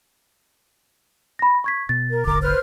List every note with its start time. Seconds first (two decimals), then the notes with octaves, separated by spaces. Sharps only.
1.39 B5 A#6
1.64 C#6 G#6 B6
1.89 B2 A6
2.10 A#4
2.25 D#1 G#1 D3 A#4 D6
2.42 B4 C5 F6